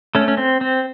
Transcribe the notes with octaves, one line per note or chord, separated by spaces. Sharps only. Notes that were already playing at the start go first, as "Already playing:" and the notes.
A3 C#4
C#4
C4
C4